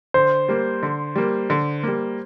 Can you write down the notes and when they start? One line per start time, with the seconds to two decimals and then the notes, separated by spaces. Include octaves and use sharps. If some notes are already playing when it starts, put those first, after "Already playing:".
0.14 D3 C5
0.49 G3 A#3
0.83 D3
1.16 G3 A#3
1.50 D3
1.83 G3 A#3